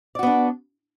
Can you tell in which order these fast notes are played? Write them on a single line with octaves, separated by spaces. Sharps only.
D5 F#4 B3 D4